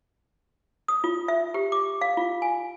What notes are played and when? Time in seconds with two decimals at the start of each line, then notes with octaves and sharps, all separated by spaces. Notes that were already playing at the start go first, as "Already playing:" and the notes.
0.88 D#6
1.04 F4
1.28 E5
1.54 G4
1.72 D6
2.01 F5
2.17 F4
2.42 G#5